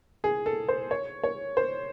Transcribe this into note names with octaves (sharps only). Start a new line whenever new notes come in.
G#4
A4
C5
C#5
C#5
C5